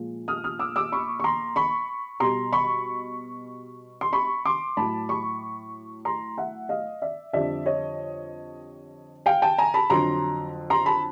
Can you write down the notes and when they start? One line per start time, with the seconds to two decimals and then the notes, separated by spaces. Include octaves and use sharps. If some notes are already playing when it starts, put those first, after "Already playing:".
Already playing: A#2 F3 G#3
0.28 D#6 F6
0.44 D#6 F6
0.59 D6 E6
0.76 D6 E6
0.92 B5 C#6
1.20 C#6
1.24 A#5 C6
1.56 B5 C#6
2.20 B2 G3 A#5 C6
2.53 B5 C#6
4.01 C6
4.13 B5 C#6
4.45 C6 D6
4.77 A2 F#3 A5 B5
5.09 B5 C#6
6.05 A#5 C6
6.38 E5 F#5
6.69 D#5 F5
7.02 D5 E5
7.33 F2 D3 G3 D5 E5
7.66 C#5 D#5
9.26 F5 G5
9.42 G5 A5
9.58 G#5 A#5
9.74 A5 B5
9.90 F2 D3 F#3 A#5 C6
10.70 A#5 C6
10.86 A5 B5